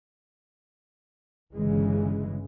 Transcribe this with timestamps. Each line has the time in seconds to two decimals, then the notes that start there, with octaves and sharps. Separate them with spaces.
1.54 G1 C#3 E3 G#3